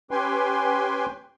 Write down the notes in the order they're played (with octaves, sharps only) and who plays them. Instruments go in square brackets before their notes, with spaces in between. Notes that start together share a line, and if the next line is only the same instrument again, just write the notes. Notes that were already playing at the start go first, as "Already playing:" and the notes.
[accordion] C#4 G4 B4 G5 G#5 C6